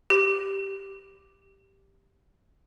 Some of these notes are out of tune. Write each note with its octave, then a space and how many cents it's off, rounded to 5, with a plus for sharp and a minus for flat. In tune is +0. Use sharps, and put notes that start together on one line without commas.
G4 +0